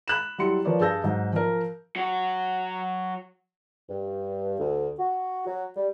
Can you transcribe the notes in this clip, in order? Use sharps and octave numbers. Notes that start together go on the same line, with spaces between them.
B5 F#6 E7
F#3 G3 E4 C6 C#7
F3 A#4 B4 C#5 D5
G2 G#4 A5 E6 G6 A#6
G#2 F#3
F3 A#4
F#3 F#4
G2
D2
F#4
F#3
G3